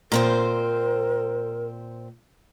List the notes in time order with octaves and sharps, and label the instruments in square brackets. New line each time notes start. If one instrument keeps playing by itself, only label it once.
[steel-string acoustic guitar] A#2 C4 C5 [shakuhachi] A#4